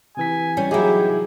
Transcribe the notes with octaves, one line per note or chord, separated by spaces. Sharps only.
C3 E3 G#5 B6
G3 C#4
F#3 D#4 E4 G4 G#4